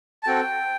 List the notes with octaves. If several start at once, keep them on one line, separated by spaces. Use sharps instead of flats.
A5
C4 F#4 A4 G5